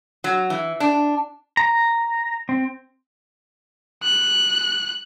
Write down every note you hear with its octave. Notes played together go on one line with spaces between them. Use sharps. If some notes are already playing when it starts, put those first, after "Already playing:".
F#3
E3
D4
A#5
C4
F#6